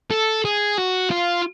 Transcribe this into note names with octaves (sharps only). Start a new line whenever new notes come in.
A4
G#4
F#4
F4